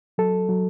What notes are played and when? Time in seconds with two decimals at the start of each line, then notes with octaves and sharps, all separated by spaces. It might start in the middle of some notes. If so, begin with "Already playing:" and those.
0.18 F#3 A4
0.49 F#3